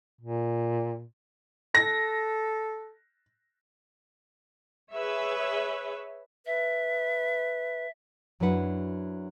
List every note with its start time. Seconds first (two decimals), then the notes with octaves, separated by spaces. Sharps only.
0.21 A#2
1.75 A4 A#6
4.93 G#4 B4 C#5 E5
6.46 B4 E5
8.40 F#2 F#3 D4 E4 B4 F#5